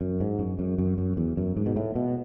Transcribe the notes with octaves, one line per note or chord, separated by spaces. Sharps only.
F#2
G#2
F#2
F#2
F#2
F#2
E2
F#2
G#2
B2
A2
B2